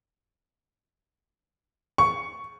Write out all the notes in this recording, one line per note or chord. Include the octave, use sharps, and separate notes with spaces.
C#6